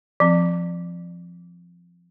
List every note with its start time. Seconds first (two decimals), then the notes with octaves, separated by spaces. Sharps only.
0.20 F3 C4